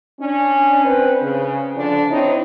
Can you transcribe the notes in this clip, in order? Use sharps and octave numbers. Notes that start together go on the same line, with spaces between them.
C#4 D4
C4 B4 C5
C#3
D3 F3 D4
C4 D#4 E4 C#5